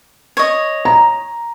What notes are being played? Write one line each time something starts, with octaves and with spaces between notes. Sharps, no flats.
C#5 D#5
A#5